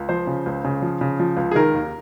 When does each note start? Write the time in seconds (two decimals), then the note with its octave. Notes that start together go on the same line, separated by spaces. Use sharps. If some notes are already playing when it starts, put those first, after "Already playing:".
Already playing: C#2
0.09 F3 C5
0.27 C#3
0.46 C#2
0.65 C#3
0.82 F3
1.01 C#3
1.19 F3
1.37 C#2
1.51 G#4
1.55 D#3 A#4
1.74 D#2